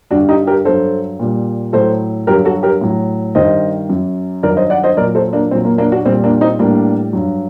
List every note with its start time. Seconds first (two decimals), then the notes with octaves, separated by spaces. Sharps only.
0.11 G2 D3 G3 D4 F#4
0.29 D#4 G4
0.47 G4 A#4
0.65 G2 F#3 A4 C5
1.20 A#2 G3
1.73 A2 F#3 A4 C5
2.27 G2 D3 F#3 G4 A#4
2.45 F#4 A4
2.63 G4 A#4
2.81 A2 F#3
3.35 G2 D#3 G3 C5 D#5
3.89 F#2 F#3
4.43 G2 D#3 F#3 A#4 D5
4.57 C5 D#5
4.70 D5 F#5
4.84 C5 D#5
4.97 A#2 F#3 A#4 D5
5.15 A4 C5
5.33 A#3 D4
5.51 A#2 C4
5.55 F#3
5.65 A#3
5.78 A#3 D4
5.92 D4 F#4
6.05 A#2 G3 C4
6.24 A#3 D4
6.41 C4 D#4
6.59 A2 G3 A#3 D4
7.13 G2 F#3